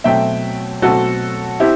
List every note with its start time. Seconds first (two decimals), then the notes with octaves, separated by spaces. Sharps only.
0.04 B2 F#3 A3 C4 E5 G5
0.82 B2 F#3 A3 C4 F#4 A4
1.60 C4 E4 G4